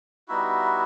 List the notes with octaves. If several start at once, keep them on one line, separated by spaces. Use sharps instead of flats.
G3 B3 D#4 E4 F#4 E5